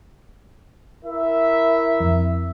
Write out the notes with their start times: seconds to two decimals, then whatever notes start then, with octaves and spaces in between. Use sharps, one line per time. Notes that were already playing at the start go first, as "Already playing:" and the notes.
1.04 E4 A#4 E5
2.00 F2